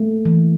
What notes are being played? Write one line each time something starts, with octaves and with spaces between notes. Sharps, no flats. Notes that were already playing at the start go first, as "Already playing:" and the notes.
Already playing: A3 A#3
E3